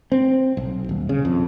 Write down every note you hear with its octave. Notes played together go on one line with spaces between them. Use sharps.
C4
B1
D#1
C#3
F2